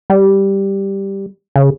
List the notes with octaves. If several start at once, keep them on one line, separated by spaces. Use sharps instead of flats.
G3
C#3